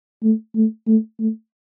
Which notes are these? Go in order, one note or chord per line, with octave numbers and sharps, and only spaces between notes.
A3
A3
A3
A3